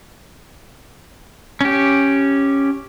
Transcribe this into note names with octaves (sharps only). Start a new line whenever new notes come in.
C#4 G4